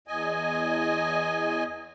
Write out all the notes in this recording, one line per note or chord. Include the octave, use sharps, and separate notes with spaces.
E2 D#5 G#5